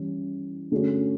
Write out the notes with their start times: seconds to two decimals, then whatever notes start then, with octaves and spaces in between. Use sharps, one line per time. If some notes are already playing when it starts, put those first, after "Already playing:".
Already playing: E3 G3 C#4
0.72 D3 A3 C#4 F#4